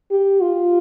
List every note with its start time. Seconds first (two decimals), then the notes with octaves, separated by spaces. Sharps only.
0.11 G4
0.41 F4